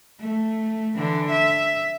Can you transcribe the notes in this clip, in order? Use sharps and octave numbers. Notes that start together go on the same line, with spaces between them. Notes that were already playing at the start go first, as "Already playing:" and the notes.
A3
D3 E3
E5